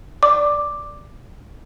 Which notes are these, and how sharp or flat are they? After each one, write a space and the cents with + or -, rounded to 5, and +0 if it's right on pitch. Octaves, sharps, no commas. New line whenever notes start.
D5 +0 D6 +5